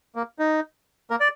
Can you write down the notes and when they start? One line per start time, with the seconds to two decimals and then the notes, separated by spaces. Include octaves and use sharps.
0.15 A#3
0.39 D#4
1.10 A#3 A#4
1.20 D5